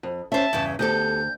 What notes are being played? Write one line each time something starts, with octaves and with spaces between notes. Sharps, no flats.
F2
C#4 C5 E5 A5
E2 G2 C#3
D2 B3 G4 A4 G6